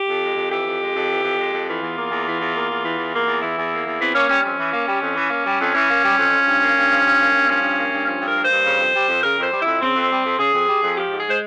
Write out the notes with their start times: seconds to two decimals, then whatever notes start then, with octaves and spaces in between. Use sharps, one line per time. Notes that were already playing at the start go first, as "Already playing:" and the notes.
Already playing: G4
0.08 F2
0.22 G#3
0.37 F2
0.50 E3 G4
0.66 F2
0.81 G#3
0.94 F2
1.10 E3
1.23 F2
1.38 G#3
1.53 F2
1.67 E3 F4
1.82 E2
1.97 A#3
2.11 E2
2.25 E3
2.40 E2
2.54 A#3
2.69 E2
2.83 E3
2.98 E2
3.13 A#3
3.27 E2
3.41 E3 E4
3.57 E2
3.71 A#3
3.85 E2
3.99 E3 C4
4.14 A#3 C#4
4.29 G3 C#4
4.43 F2 C#4
4.58 E3
4.73 A#3
4.87 G3
5.01 F2
5.15 E3
5.30 A#3
5.45 G3
5.60 F2
5.74 E3 C#4
5.89 A#3
6.04 G3
6.18 F2
6.32 F3
6.47 G2
6.61 A#3
6.76 G2
6.90 F3
7.04 G2
7.20 A#3
7.34 G2
7.48 F3 C#4
7.62 G2
7.78 A#3
7.91 G2
8.06 F3 C#4
8.21 G2
8.26 A#4
8.36 A#3
8.45 C5
8.50 G2
8.64 C#3
8.79 F2
8.94 G3
9.08 F2
9.23 C#3 A#4
9.38 F2 C5
9.52 G3
9.62 F2 E4
9.81 C#3 C4
9.95 F2
10.10 G3
10.25 F2
10.38 C#3 G#4
10.54 F2
10.68 G3
10.83 F2
10.97 F3 G4
11.11 G#2
11.17 G#4
11.26 G#3 C5